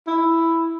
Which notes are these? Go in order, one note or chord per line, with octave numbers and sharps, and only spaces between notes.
E4